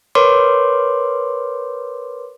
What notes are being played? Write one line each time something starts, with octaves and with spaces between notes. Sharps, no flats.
A#4 B4 C#5 C6 D6